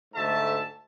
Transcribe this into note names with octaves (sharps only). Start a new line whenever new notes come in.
D2 G#2 A3 E5 A5